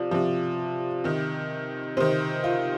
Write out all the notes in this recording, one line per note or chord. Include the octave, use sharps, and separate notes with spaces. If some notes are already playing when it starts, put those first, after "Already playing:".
Already playing: C3 F3 D5
C3 F3
C3 D#3
C3 D#3 C5
F4